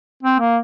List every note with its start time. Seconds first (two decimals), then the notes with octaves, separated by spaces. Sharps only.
0.23 C4
0.39 A#3